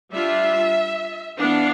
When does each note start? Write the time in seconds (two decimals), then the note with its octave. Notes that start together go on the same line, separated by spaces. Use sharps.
0.11 G3 D4 F4 E5
1.37 E3 B3 D4 F5